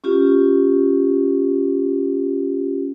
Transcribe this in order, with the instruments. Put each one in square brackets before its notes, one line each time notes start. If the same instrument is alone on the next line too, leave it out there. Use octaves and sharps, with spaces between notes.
[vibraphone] C#4 F4 G4